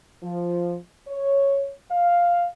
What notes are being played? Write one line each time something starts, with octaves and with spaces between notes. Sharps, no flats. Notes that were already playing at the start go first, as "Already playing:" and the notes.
F3
C#5
F5